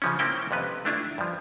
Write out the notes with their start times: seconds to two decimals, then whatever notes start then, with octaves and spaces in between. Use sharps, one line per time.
0.02 C#3 F3 C#4
0.19 A#3 C4 C#4 E4 G5
0.51 F2 C3 B3 B4
0.85 A3 D4 E4 F4
1.18 G2 F3